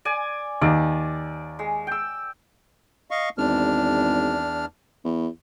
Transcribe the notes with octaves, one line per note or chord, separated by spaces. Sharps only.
D5 G#5
D#2 D5
G#3
G5 E6
D#5 F5 C#6
G#1 E2 D4 F6
E2